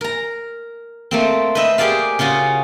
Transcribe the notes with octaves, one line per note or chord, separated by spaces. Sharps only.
A#4 A#5
A3 A#3 C4
B4 C5 D#5 E5
G4 G#4 A#4 D5 F5
C#3 C#4 F4 F#4